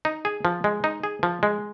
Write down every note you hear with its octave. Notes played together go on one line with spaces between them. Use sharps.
D#4
G#4
F3
G#3
D#4
G#4
F3
G#3